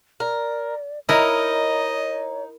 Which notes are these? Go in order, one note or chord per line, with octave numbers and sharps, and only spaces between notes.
A#4 D5
D#4 E4 A#4 C#5 D#5